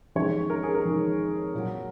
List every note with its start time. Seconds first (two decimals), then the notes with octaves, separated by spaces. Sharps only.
0.15 F2 D#3 G#3 C#5
0.50 A#4
0.63 G#4
0.75 A#4
0.85 F2 D#3 G#3
1.54 A#2 F#3